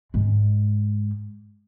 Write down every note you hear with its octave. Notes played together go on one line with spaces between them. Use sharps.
G#2 G#3